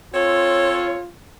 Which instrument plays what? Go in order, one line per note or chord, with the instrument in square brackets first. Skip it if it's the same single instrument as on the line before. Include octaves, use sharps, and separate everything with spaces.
[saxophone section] C4 A4 C#5 [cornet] F4